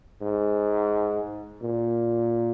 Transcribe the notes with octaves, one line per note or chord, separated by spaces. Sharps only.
G#2
A#2